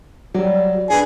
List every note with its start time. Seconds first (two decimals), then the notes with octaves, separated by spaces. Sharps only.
0.35 F#3 G3 D5
0.90 D4 G#4 B4